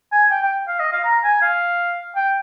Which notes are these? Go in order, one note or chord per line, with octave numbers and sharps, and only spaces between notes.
G#5
G5
G5
F5
D#5
F5
A#5
G#5
F5
G5